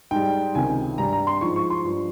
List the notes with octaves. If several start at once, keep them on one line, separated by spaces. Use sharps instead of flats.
G#2 G3 G5
C#2 C3 D#3 G#5
G2 G3 A#5
A#5
C6
G#2 F3 C#6
C#6
C6
G2 F3